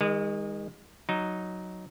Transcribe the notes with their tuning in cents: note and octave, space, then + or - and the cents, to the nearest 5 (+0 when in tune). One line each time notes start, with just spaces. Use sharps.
D#3 +20 G#3 -30
F#3 +0 D#4 +0